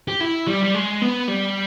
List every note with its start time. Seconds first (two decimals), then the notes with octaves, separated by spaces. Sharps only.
0.08 G4
0.20 E4
0.47 G3
0.64 G3
0.75 G#3
1.02 B3
1.28 G3